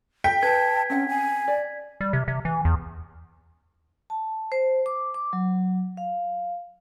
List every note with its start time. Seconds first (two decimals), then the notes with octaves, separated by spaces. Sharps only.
0.24 A4 G5 B6
0.43 B4 A5 G#6
0.90 C4 C#4 F#5
1.09 G#5
1.48 D5
2.01 G3
2.13 C3
2.28 C3
2.45 E3
2.65 E2
4.10 A5
4.52 C5
4.86 D6
5.14 D6
5.33 F#3
5.97 F5